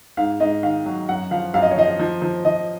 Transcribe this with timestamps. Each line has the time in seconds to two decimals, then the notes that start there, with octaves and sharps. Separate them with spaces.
0.17 G#2 F5
0.40 G#2 D#5
0.63 D#3 F5
0.86 F#3
1.09 F#2 F#5
1.31 F3 F5
1.54 F#2 F5
1.62 D#5
1.71 C#5
1.76 F3 D#5
2.00 F3
2.22 F3
2.45 F3 D#5